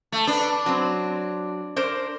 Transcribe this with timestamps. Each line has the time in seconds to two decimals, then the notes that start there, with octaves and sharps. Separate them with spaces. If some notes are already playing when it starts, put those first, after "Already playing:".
0.12 A3
0.27 D4 B4
0.66 F#3 C4
1.76 D4 A#4 C5